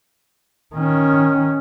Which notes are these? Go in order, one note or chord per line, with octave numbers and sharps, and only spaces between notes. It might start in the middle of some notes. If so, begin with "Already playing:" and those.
D#3 C#4